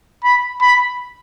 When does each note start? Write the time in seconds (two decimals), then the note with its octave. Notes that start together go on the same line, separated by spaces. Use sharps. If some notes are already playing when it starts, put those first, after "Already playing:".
0.24 B5
0.62 B5